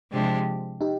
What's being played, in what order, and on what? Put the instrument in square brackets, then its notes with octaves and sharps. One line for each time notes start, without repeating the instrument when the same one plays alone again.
[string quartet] C3 F3 G#3 D4 G4
[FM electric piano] D#4 G4